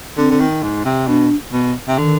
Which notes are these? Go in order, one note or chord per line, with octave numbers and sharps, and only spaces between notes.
D3 C4
D3
D#3
G#2
C3
B2 D4
B2
C3
D3 D#3